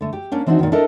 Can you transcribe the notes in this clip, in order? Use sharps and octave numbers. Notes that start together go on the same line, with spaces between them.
D3 A3
G4
A#3 C#4 D4
E3 C4 D4 D#4 F#4
A#2 D#3
D4 E4 A4 A#4 D#5